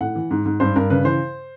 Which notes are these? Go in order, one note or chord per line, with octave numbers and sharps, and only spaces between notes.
A2 F#5
E3
G#2
G#2
G2 C5
G2 A#4
C#3 B4
E3 C5